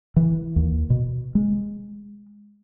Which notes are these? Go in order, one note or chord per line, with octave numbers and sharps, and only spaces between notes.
E3
D#2
B2
G#3